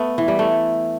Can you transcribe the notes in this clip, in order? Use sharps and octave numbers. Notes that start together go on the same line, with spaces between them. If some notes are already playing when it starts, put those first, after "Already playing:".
Already playing: A3 B3
E3
G3
A3